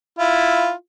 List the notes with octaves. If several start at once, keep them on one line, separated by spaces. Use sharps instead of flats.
E4 F4